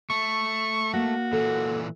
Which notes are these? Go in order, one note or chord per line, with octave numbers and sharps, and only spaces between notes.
A3 C#6
A#3 F#4
A#2 E3 A4